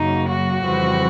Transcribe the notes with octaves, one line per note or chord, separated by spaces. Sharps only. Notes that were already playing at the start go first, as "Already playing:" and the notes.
Already playing: F#2 C#3 F#3 A#3 D#4
F#4
F2 C#3 E3 G3 C4